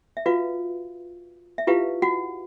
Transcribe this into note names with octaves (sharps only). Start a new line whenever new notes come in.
E5
F4 F#4 B4 F5
E5
E4 F4 G4 B4 F5
F#4 F#5